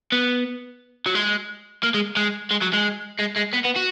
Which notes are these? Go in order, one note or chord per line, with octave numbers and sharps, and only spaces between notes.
B3
F#3
G#3
A#3
G#3
G#3
G#3
F#3
G#3
G#3
G#3
B3
B3
F#4